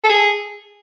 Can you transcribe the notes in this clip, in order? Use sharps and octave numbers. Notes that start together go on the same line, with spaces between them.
A4
G#4